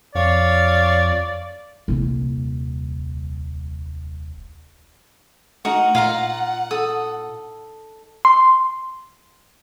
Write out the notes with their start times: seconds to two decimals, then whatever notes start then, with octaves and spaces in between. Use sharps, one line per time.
0.15 F2 C#5 D5 F5
1.88 D#1 C2
5.65 A3 D#4 F#4 A#4 F#5
5.95 A#2 F4 F5 A#5
6.71 A4 D#6
8.25 C6